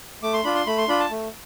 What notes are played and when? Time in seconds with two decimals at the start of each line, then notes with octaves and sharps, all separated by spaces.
0.23 A3 D6
0.33 C6
0.44 D4 F4 B5
0.55 C6
0.67 A3 B5
0.78 C6
0.88 D4 F4 B5
1.00 A5
1.10 A3